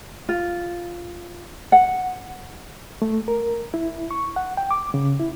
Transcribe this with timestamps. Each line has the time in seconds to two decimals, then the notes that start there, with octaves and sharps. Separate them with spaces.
0.29 F4
1.72 F#5
3.02 A3
3.28 A#4
3.74 E4
4.11 C#6
4.36 F#5
4.57 G5
4.71 D6
4.94 C#3
5.20 E4